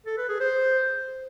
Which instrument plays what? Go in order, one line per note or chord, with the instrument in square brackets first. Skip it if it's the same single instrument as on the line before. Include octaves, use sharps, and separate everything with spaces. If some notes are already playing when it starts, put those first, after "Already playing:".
[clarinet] A4
B4
G#4
C5